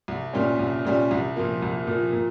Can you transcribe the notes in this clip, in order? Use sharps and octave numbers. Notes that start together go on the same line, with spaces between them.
C2
A#2 G3 C#4
C2
A#2 G3 C#4
C2
A#2 F3 A#3
C2
A#2 F3 A#3
A#2